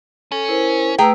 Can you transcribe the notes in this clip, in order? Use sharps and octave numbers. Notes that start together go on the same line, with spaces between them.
C#4 A4
E4 A#4 C5
A3 G#4 B4 G5 A#5 E6